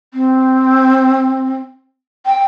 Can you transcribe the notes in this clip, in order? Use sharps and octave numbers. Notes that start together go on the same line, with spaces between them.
C4
G5